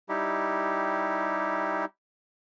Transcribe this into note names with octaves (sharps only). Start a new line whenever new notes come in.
G3 D#4 E4 G4